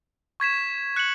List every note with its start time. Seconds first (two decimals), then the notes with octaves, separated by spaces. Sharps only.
0.40 C#6 G#6 B6 E7
0.96 F#6 C#7 F#7